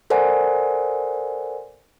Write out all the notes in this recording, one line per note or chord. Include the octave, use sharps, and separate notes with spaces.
A4 A#4 C5 D5 F#5 G#5